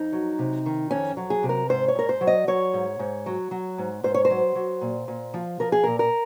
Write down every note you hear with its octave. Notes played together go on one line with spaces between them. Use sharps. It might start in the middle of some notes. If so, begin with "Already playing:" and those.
Already playing: F2 D#4
F#3
C3
D#3
F2 C#4
F#3
G#4
C3
A#4
G#2 C5
C#5
G#2 A#4
C5
F#3
D#5
F#3 C#5
G#2
G#2
F#3
F#3
G#2
G#2 C5
C#5
C5
F#3
F#3
A#2
A#2
F3
F3 A#4
G#4
A#2 A#4
A#4